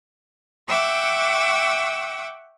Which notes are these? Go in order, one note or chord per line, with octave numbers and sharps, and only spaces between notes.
E5 F#5 G5 C#6 D6 E6